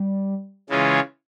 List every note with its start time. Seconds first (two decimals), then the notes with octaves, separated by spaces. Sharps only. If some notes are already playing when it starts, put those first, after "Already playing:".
Already playing: G3
0.69 C#3 E3 G#3 C#4 F4